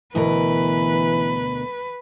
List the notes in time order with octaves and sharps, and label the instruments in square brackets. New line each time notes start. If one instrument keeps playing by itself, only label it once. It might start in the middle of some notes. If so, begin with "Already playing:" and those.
[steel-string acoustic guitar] D2 B2 A#4 [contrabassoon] E3 [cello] B4